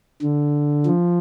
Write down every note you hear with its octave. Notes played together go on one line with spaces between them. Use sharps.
D3
F3